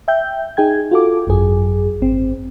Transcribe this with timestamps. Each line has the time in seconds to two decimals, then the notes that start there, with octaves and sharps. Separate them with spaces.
0.08 E5 G5 G6
0.57 D#4 G#4 G5 G#6
0.91 F4 F#4 A4 D6
1.27 G#1 F#2 G#4
2.01 G#1 C4